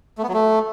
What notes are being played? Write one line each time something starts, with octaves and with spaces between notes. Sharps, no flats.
A3
B3
F#3
A3